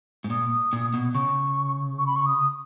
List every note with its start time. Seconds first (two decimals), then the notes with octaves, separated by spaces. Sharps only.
0.24 G#2
0.30 A#2 D#6
0.73 A#2
0.94 B2
1.14 C#3 C#6
1.98 C#6
2.07 B5
2.16 C#6
2.26 D#6